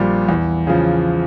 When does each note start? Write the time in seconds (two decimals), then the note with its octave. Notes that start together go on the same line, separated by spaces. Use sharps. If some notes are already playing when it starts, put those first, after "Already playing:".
Already playing: A#1 A#2 G3
0.29 E2
0.67 C#3 F3